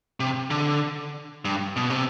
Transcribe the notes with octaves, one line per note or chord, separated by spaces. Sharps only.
C3
D3
G2
B2
C3